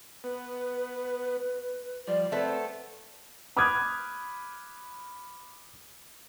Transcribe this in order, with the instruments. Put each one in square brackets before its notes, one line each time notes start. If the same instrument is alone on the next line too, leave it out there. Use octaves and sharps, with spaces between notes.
[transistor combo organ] B3 [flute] B4
[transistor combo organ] F3 G3 [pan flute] D5
[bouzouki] A3 B3 [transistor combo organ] C4
[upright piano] B5 D6 D#6 F6 F#6 G#6